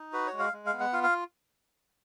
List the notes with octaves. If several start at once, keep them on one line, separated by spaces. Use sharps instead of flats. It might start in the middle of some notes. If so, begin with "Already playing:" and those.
Already playing: D#4
F#4 B4
C#5
G#3
F5
G#3
F5
B3
F#5
F4 F5
F5